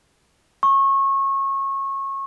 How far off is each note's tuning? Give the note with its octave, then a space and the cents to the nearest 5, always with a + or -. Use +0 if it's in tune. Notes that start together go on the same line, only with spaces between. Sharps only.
C#6 -25